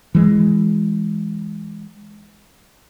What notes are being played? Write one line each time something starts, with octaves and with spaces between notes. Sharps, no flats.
E3 G#3